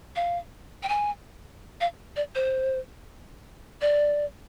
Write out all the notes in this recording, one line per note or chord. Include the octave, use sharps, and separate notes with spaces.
F5
G5
G#5
F5
D5
C5
D5